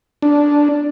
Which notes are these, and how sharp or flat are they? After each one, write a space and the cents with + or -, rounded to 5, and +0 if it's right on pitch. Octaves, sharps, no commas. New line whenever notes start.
D4 -5